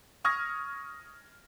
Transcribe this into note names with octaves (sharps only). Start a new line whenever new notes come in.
C#6 D#6 F6 G#6 A#6